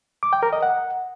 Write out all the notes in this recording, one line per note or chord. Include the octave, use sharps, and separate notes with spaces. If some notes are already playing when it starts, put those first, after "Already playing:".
D6
G5
A#4
D#5
F#5